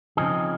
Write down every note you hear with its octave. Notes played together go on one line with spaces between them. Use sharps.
C#3 F3 C4 D#4 G#4